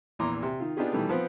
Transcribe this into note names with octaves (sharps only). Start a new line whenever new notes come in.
A#1 E2 E3 A#5 C6 D6
C3
D#3 F4
B3 D4 D#4 F4 G4 G#4
B2 D#3 E3 G3 A3
F3 B3 C4